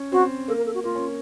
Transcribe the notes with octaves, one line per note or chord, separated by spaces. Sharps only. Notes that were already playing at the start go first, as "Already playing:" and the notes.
Already playing: C#4
C4 F#4
A#3 A4
A#4
A4
F#4
A#3 F4
C#4